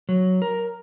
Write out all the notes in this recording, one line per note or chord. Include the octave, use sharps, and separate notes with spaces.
F#3
A#4